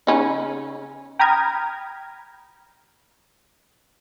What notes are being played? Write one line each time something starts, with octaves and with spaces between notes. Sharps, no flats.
C#3 C#4 D#4
G5 A#5 B5 D#6 F6 G#6